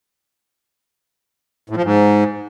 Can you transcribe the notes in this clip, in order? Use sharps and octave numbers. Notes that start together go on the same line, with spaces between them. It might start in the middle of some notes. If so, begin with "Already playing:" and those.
A2
F3
G#2